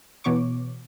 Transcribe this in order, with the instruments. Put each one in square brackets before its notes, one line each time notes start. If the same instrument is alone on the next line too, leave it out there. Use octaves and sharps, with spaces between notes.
[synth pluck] B2 E3 B3 C#5 C#6 D6